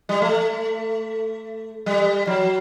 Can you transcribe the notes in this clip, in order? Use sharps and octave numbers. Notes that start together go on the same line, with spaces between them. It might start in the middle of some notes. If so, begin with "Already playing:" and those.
G3
A3
G3
F#3